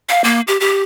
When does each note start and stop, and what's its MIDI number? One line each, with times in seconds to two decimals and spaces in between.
0.09 0.22 77
0.24 0.41 58
0.47 0.60 67
0.60 0.83 67